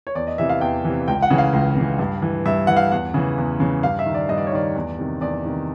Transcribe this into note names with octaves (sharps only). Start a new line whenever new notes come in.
C#5
E2 D5
D#5
C3 E3 E5
F5
E2 G5
C3 E3
C#2 G5
F#5
C#3 E3
F5
C#2
C#3 E3
G2
E3
G2 E5
E3 F#5
F5
E2 F#5
C#3 E3
E2
C#3 E3
G2 F5
E5
D#3
D5
G2 D#5
D5
C#5
D#3 D5
E2
C3 D#3
E2 D5
C3 D#3